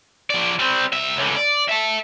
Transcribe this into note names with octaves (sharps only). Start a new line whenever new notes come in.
F3 D5
G3 C4
C2 E5
C#2 D3
D5
E5 A5